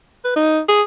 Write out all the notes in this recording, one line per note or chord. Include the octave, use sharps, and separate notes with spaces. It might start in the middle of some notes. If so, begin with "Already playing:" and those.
B4
D#4
G#4